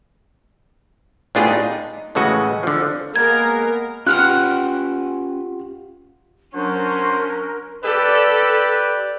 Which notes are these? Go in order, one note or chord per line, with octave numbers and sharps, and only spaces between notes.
A2 B3 D4 F4 G4 G#4
D#4
A2 C#3 E3 G#3 F#4 D#5
D3 F3
G#3 A#3 B3 A#4 G#6
C#4 F4 G4 B4 F#5 G5 F6 F#6
F#3 C#4 D4 A#4 C5
G4 A4 B4 D5